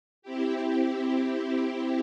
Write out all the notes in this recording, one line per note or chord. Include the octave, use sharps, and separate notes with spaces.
C4 E4 G4